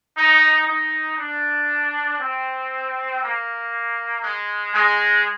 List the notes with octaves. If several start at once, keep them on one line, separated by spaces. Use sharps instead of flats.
D#4
D#4
D4
C4
A#3
G#3
G#3